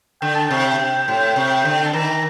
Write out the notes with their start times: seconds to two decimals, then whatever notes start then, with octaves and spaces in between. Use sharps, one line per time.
0.22 D3 G5
0.35 A5
0.47 C3 G5
0.79 C3
1.08 A2
1.36 C3
1.65 D3
1.85 A5
1.93 D#3 A#5